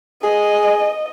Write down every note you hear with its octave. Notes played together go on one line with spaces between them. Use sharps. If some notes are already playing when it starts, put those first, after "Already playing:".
G#4 D#5